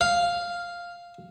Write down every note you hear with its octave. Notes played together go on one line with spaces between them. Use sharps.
F5